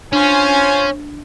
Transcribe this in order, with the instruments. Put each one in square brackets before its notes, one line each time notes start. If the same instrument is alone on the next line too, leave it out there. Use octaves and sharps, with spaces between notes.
[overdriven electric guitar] C#4 [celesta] D4 [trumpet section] F4 C5 G#5